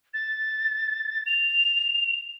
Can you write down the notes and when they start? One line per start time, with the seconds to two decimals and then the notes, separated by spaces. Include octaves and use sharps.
0.13 A6
1.26 F7